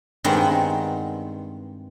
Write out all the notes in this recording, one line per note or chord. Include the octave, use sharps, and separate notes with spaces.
G2 D#3 G#3 B3 C4 F#5